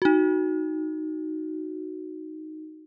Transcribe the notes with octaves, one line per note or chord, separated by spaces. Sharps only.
D#4 F#4